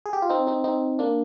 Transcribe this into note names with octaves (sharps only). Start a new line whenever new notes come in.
G#4
G4
F4
C4 D#4
C4 D#4
C4 D#4
A#3 D4